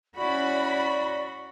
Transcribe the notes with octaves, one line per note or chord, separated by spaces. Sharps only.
C#4 E4 F#4 D5 B5